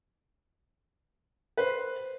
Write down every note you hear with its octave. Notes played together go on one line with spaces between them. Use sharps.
B4 C5